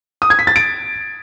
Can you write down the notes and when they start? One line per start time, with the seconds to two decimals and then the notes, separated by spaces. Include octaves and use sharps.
0.22 D#6
0.30 G#6
0.39 B6
0.47 A6
0.56 D7